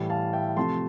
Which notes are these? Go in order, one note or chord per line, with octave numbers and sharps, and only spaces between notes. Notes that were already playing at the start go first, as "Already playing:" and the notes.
Already playing: A2 E3 G3
F5 A5
E5 G5
C3 F3 A3 A5 C6